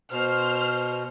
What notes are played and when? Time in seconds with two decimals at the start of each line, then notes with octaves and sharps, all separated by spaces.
0.12 B2 C5 F6